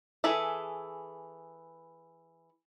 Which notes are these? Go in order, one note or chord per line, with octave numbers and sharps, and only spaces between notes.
E3 G#4 A4 E5